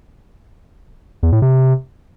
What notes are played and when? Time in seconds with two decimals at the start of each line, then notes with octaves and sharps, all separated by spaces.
1.23 E2
1.32 A2
1.42 C3